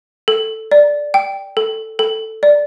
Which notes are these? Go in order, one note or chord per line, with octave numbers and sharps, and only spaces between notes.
A4
D5
G5
A4
A4
D5